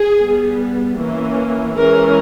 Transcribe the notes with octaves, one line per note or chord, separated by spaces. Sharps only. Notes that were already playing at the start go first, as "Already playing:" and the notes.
Already playing: G#4
G3 B3
E3 A#3 C#4
E3 G#3 C#4 A#4